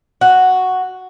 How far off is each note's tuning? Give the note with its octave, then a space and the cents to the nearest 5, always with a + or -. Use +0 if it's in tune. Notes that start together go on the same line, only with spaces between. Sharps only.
F#4 +0